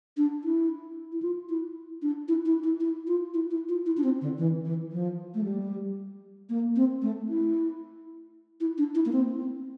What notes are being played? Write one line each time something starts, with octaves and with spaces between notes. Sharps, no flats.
D4
E4
E4
F4
E4
D4
E4
E4
E4
E4
F4
E4
E4
F4
E4
D4
C4
D3
E3
E3
F3
A3
G3
A#3
C4
A3
E4
E4
D4
E4
A#3
C4
C4